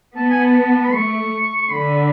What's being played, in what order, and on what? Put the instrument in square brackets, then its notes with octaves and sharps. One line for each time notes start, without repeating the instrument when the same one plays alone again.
[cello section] B3 [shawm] A5
[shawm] G#5
A5
B5
[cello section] A3 [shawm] C#6
[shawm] C#6
[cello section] D3 [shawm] B5